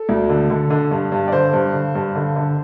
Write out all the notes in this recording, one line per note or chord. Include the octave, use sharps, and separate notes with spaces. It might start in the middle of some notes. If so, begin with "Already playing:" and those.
Already playing: A4
D2
D3
D3
D3
G2
G2
D5
D3 C5
G2
D3
G2
D3
D3